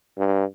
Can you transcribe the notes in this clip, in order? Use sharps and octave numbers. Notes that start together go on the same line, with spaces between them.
G2